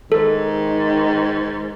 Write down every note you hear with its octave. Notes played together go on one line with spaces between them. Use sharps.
G#2 D#3 A4